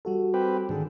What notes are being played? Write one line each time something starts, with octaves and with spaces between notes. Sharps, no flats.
G3 F#4 A4
C4 G4 B4
G#2 D3 D#3 G#4